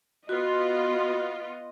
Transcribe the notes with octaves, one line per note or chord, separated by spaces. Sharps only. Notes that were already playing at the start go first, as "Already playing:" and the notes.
B3 F4 F#4 D#5